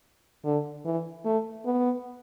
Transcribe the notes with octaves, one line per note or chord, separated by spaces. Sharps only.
D3
E3
A3
B3